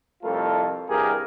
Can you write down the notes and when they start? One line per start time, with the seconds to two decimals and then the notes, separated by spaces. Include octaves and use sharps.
0.23 C2 F2 A3 F4 A4 A#4
0.89 C2 G2 G4 G#4 A#4